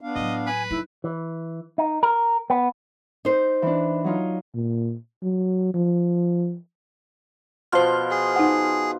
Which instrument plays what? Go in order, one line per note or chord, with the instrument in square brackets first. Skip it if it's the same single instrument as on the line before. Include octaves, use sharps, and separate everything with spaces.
[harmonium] B3 D4 F5
[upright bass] A2 F#3 [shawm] D#5
[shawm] B4 [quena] G#5
[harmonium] A2 [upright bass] F#3 D#4 [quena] E4
[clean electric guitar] E3
D#4
A#4
B3
[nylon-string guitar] D#4 C5
[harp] E3 D4
F#3 D#4 F4
[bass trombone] A#2
F#3
F3
[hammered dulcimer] B2 F3 F4 [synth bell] C5 F6
[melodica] G#4
[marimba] D#4 F#5